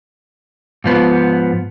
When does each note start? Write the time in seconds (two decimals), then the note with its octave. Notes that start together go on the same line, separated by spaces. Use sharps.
0.84 G#2 F3 B3